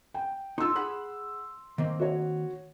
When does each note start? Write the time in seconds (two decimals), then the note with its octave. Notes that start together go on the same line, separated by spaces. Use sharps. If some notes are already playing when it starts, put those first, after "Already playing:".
0.14 G5
0.58 D#4 F4 C6 E6
0.75 G#4 F#5 B5
1.78 D#3 A#3 C4
1.99 F#4 C#5